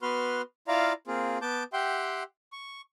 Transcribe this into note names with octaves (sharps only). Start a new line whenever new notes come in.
B3 F#4 B4 C6 F6
E4 F4 D5 F5 A#5
A#3 C4 F4 G#4
B3 A5 D6 G6
G4 E5 F#5 G5 C6
C#6